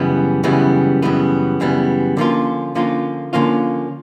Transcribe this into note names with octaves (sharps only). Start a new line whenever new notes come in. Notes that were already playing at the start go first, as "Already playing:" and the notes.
Already playing: F#2 C#3 E3 G3 B3
F#2 C#3 E3 G3 B3
F#2 C#3 E3 G3 B3
F#2 C#3 E3 G3 B3
D3 F3 A#3 C#4 F4
D3 F3 A#3 C#4 F4
D3 F3 A#3 C#4 F4